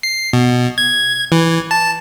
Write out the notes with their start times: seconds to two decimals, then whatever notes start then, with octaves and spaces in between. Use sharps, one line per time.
0.03 C7
0.33 B2
0.78 G#6
1.32 E3
1.71 A5